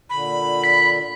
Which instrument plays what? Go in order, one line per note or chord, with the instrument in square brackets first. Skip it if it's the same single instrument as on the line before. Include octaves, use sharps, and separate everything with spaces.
[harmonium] A#2 D3 [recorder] B5
[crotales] B6